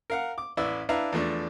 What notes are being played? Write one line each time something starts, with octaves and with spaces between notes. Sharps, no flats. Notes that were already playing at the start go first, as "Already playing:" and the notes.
A#4 F5 F#5
D6
A1 E4 B4 D5 E6
D4 E4 B4 E5 F5 A#5
E2 F3 A3 D4